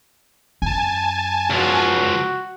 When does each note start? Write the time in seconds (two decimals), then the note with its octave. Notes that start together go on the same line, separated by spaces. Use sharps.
0.62 F#2 G#5 A5
1.50 C#2 F3 F#4